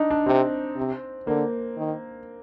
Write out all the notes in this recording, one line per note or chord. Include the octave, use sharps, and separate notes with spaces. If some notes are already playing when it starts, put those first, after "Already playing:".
Already playing: D4 D#4
D4
C3 C4
C3
D3 A#3
D#3